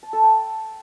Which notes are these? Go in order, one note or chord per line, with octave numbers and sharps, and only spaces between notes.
A5
A4
G5